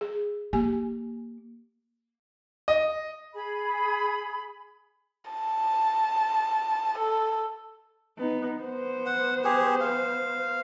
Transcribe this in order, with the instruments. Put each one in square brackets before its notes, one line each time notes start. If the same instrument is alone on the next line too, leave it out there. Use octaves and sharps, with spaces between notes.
[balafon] G#4
[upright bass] A#3 [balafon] G4 G#5
[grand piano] D#5
[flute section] G#4 B5
[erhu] A5
A4
[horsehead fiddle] B3 D#4
B3 C5
[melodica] F#5
G4 G#4
F5